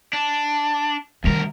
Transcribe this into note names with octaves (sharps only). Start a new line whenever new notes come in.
D4
D2 D#3 G3 A#4